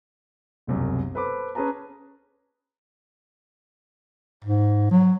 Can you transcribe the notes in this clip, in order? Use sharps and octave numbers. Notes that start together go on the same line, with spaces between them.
E1 C2 F#2
A4 B4 C5 B5 D6
C#4 G#4 B4 A5 A#5
G#2
F#3